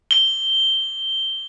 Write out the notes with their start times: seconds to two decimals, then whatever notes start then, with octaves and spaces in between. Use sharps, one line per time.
0.11 G7